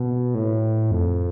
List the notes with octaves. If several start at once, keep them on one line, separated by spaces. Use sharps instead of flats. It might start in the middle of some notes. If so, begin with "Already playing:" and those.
Already playing: B2
A2
F2